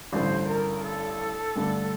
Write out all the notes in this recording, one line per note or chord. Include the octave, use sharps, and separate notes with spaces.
A1 G2 D3 C5
A#4
A4
G2 D3 A3 D4